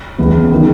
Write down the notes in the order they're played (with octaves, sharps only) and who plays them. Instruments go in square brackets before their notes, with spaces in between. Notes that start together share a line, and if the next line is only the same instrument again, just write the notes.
[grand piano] C#2 C#3 E3 B3
D#3 G#3 D#4